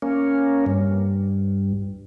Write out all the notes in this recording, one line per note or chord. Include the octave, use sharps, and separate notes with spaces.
A#3 C#4
G2